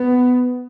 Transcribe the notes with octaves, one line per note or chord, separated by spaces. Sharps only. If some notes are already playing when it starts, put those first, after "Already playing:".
Already playing: B3